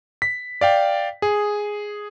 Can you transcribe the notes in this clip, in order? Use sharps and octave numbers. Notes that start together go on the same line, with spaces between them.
B6
D5 F5 G5
G#4